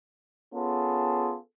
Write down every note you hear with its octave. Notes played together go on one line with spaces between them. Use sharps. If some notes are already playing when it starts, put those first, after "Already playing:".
B3 C#4 F4 G#4 A4